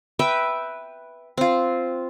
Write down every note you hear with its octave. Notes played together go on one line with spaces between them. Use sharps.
B4 E5 G5
C4 F4